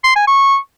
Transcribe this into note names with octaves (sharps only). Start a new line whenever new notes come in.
C6
G#5
C#6